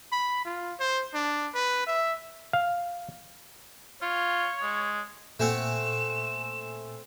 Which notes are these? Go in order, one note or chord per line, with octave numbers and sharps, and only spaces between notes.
B5
F4
C5
D4
B4
E5
F5
F4 C#5
G#3
A#2 A3 C4 F#5 G#5 E6 E7